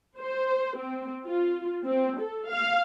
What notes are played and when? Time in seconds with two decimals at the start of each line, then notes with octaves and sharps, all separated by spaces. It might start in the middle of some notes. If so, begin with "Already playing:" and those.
0.19 C5
0.76 C4
1.26 F4
1.85 C4
2.19 A4
2.50 F5